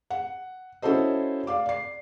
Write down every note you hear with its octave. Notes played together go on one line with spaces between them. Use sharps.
F#5
C#4 E4 F#4 A4 C5 D#5
D5 F5 D6
D5 C7